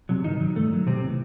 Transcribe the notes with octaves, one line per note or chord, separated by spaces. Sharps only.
C3 F#3
G2 D#3 D#4
D#3 F#3
G2 A3
D#3 F#3
B1 C3 C4
A2 E3